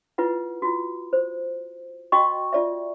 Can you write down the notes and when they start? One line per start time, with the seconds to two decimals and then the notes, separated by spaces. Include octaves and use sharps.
0.18 E4 F4 B4 F#5
0.62 F4 F#4
1.13 C5
2.12 F#4 D#5 G5 C#6
2.53 F4 D5 E5